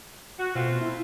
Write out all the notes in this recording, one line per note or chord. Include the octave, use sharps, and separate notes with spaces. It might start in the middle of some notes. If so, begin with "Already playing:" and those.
F#4
B2 A3 C4 F4
E4